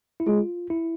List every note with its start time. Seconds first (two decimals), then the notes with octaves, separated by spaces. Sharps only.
0.20 E4
0.27 G#3 F4
0.70 E4